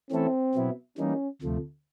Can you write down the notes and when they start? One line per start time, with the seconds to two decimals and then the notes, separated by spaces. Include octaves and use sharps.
0.11 E3 A3 C4 C#4 E4 A4
0.55 B2 F#3 B3 E4
0.98 E3 G3 A#3 C#4 D#4
1.42 D2 C3 F3 A3